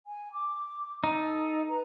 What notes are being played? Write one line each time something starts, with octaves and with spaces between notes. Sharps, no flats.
G#5
D6
D#4 A4
B4 A#5